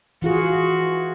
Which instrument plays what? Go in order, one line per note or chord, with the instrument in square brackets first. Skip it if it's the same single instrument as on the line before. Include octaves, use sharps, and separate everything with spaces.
[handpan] E3 F4 G#4 [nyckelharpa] F#4